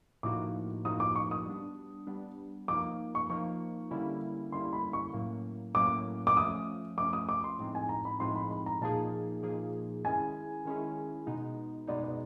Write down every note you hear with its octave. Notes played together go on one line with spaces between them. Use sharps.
A2 F3 A#3 D#4 F#4 D6
A2 F3 A#3 D#4 F#4 D#6
D6
C#6
D#6
G3 B3 D4
G3 B3 D4
F3 A#3 D#4 D6
C#6
F3 A#3 D#4 C#6
D3 G3 A#3 C#4 E4
D3 G3 A#3 C#4 E4 C6
B5
C#6
A2 F#3 A#3 C#4
A2 F#3 A#3 C#4 D6
D6
F3 A3 C#4 D#6
F3 A3 C#4 D6
D#6
D6
C6
A2 F3 G#3 C4 D#4
G#5
A#5
B5
A2 F3 G#3 C4 D#4 C6
B5
B5
A#5
A#2 F3 A#3 D#4 G#4 A5
A#2 F3 A#3 D#4 G#4
D#3 G#3 C#4 E4 G#4 G#5
D#3 G#3 C#4 E4 G#4
B2 G#3 B3 D#4
B2 G#3 B3 D#4 D5
D5